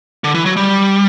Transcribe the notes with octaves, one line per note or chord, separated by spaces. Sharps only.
D3
E3
F#3
G3